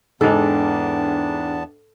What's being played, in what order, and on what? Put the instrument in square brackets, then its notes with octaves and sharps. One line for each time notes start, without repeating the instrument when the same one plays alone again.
[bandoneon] E2 B3 A5 [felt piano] G#2 G#3 [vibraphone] D4 G5 [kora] A4